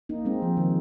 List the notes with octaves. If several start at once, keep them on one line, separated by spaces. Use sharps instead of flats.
A#3 D#4
G#3 C4
F3
D#3